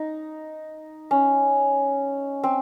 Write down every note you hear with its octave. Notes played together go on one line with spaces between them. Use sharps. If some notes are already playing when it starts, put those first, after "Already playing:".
Already playing: D#4
C#4
C4